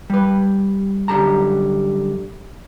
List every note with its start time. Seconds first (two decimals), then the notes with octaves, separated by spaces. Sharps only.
0.10 G3 B4
1.08 F#2 D3 G3 G4 A5 A#5